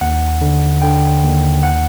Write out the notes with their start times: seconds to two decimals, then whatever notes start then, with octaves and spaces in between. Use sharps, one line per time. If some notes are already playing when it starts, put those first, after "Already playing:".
0.01 D#2 F#5
0.41 D3
0.82 D3 G5
1.23 D#2
1.63 F#5